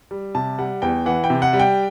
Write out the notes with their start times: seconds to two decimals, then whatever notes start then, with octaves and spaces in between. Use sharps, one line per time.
0.11 G3
0.35 C3 A5
0.58 G3 F#5
0.82 E2 G5
1.06 E3 F#5
1.24 G5
1.30 C3
1.42 F#5
1.53 G3
1.59 G5